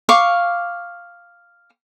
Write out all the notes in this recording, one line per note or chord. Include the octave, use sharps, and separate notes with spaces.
F5 C#6 D6